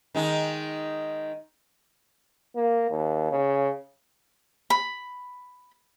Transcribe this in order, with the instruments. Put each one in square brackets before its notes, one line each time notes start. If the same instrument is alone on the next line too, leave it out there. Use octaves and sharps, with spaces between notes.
[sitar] D#3 G#3 D#4
[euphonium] A#3
D#2
C#3
[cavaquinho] B5